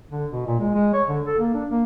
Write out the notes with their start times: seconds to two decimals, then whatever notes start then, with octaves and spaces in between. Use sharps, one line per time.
0.11 D3
0.32 B2
0.46 A#2
0.60 G#3
0.75 G#3
0.94 C#5
1.09 D3
1.27 A4
1.39 A#3
1.54 D4
1.70 A#3